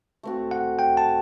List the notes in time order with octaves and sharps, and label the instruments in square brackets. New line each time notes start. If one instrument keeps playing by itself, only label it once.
[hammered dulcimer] A3 C4 F#4
[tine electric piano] F#5
G5
A5